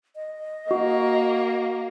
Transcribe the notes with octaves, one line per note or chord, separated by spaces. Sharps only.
D#5
A#3 F#4